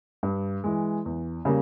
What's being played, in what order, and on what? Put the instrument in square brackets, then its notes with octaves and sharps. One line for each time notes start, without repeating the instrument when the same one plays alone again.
[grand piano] G2
E3 G#3
E2
C#3 G3 A#3